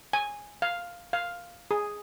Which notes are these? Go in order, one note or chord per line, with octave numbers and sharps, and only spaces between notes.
G#5
F5
F5
G#4